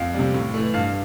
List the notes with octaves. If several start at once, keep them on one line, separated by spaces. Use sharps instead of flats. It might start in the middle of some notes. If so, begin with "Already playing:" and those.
Already playing: F2 F5
C3 G3
A2
E3 A3
G2 F5